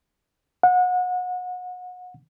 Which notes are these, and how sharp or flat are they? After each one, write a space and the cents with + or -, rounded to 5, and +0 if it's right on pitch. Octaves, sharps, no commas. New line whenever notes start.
F#5 -30